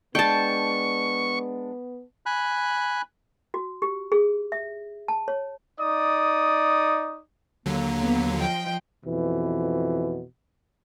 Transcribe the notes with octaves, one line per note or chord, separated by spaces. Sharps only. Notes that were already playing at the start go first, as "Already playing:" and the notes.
G#3 B3 D4 G5 A5 C#6
G#5 B5 F#6
F#4
G4
G#4
E5
A5
C#5
D#4 D5 D#6
D#2 D3 F#3 A#3
B3
F3 D#5 G5
F2 B2 E3